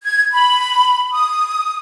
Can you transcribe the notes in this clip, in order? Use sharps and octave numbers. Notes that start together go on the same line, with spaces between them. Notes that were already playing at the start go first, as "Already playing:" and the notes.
G#6
B5
D#6